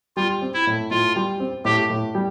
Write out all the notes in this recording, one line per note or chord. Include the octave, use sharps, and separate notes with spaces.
G3 F4
C4
E4
A2
A2 F4
G3
C4
A2 G4
A2
G3